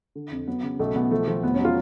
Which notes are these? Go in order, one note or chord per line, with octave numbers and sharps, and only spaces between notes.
D3
F2
F#3 B3
C#3
B1 A3
B1 B3
F3 A3
F3
F1 B3
C#4
F#3
F4